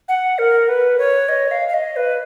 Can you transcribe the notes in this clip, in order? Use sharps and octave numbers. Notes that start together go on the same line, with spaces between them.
F#5
A#4
B4
C#5
D#5
F5
F5
D#5
B4